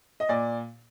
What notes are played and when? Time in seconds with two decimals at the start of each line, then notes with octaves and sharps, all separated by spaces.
0.20 D#5
0.29 A#2 D5